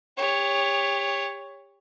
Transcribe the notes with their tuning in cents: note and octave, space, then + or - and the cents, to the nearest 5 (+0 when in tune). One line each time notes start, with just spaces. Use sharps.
G4 +35 C#5 +0